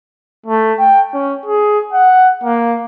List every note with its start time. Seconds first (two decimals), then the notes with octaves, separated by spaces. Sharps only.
0.46 A3
0.79 G5
1.14 C#4
1.46 G#4
1.93 F#5
2.44 A#3